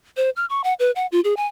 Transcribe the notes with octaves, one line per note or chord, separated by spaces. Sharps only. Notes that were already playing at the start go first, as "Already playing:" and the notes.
C5
F6
C#6
F#5
B4
F#5
F4
G#4
G#5